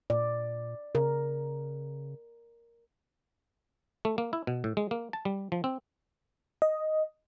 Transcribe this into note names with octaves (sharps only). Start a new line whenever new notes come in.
A#2 D5
C#3 A#4
A3
A#3
E4
B2
A2
G#3
A#3
A5
G3
F3
C4
D#5